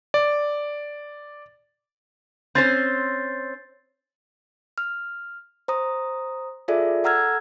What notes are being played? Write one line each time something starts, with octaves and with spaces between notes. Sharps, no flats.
D5
C4 C#4 C5 G6 A6 C7
F6
C5 A#5 D#6
F4 G#4 A4 D5 E5
A4 F#5 A#5 E6 F6 G#6